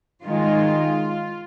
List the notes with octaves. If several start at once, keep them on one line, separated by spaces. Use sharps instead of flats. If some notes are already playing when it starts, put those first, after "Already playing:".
D#3 G#3 F4